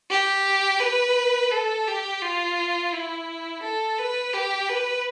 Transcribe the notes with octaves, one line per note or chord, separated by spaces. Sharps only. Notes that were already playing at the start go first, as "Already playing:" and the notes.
G4
B4
A4
G4
F4
E4
A4
B4
G4
B4